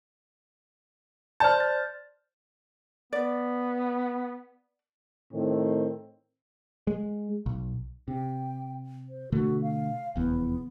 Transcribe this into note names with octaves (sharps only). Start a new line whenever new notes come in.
C5 D5 A5 F6 G6
A6
B3 D5
A2 D#3 C4
G#3
B1
C3 G5
C5
B2 D3 A3 F#4
F5
F1 E2 B3